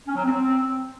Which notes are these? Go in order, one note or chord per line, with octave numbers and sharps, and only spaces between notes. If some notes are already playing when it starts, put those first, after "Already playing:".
C#4
F#3
C4